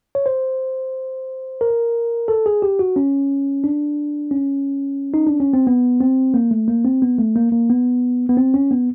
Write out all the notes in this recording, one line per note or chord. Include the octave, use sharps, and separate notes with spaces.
C#5
C5
A#4
A4
G#4
G4
F#4
C#4
D4
C#4
D#4
D4
C#4
C4
B3
C4
A#3
A3
A#3
C4
B3
A3
A#3
A#3
B3
B3
C4
C#4
B3